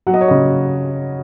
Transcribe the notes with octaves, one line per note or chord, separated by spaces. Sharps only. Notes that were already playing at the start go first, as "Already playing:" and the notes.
F#3 F#5
D#5
C#5
C#3 D#5